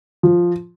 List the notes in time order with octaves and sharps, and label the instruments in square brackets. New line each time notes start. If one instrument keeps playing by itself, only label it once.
[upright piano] F3